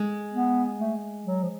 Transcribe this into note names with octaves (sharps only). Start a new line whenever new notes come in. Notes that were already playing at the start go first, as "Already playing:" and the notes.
Already playing: G#3
B3
A3
F#3
F3